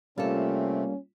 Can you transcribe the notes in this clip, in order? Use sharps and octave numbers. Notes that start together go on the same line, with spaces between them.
C3 G3 A3 A#3 C4 C#4 F4 A4